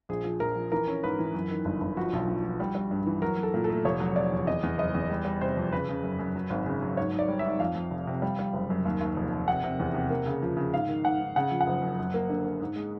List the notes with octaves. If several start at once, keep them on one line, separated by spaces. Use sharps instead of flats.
A#1 G#4
F3
A#1 A#4
F3
E3 A#4
C#4
G#2 B4
E3
F#2
D#3
G1
G1
F3 F#4
B1
F3
F3
G3
G3
G2
E3
F#3 A#4
F#3
A4
A#2
A4
A3
F1 C#5
F#3
F#3 D5
E2
E2 D#5
E2
F#1 D#5
E2
G3
G3
C3 C5
F2
C#3 B4
C#3
F#2
F#2
F#3
G#1
C#3
F#3
G#2 C#5
G#2
D5
G3
E5
G#2
F2 F5
F2
F1
C3
G3
G3
F#1
F#2
D#2
D#2
F1
F1
C3 F#5
C3
E2
C3
A#3
C#3
F3
C#3
G#2 F5
D#3
G#2 F#5
G#2
C#3 F#5
F3
F#5
F#1
F#2
F#2
A#3
D3
A#3
G#2
G#3